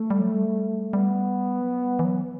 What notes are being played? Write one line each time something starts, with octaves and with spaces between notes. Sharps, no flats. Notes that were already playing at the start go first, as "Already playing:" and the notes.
Already playing: A3
G3
F#3
G3
G3 B3
F#3
G3
E3
F#3